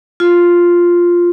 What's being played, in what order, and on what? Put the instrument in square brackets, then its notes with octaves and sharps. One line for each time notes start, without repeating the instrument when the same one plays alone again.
[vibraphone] F4